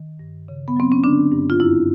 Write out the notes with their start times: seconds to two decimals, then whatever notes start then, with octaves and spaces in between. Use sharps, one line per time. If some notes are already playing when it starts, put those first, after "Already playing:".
Already playing: D#3
0.19 G2
0.48 C#3
0.68 B3
0.76 F#3 C4
0.92 C#4
1.04 D3 D4
1.32 G2
1.50 F4
1.60 F#2 E4